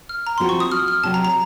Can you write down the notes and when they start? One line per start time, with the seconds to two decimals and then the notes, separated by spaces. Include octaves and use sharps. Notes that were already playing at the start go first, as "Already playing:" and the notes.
0.09 F6
0.27 A#5
0.38 F3 A3 C4 F#4 C6
0.49 C#6
0.60 D#6
0.72 F6
0.88 F6
1.03 C3 F#3 A3 A5
1.14 A#5
1.25 A#5